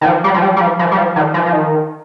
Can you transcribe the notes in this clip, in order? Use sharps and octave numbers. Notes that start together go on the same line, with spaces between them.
D#3
F3
G3
F3
G3
G3
F3
F3
G3
F3
D#3
F3
F3
D#3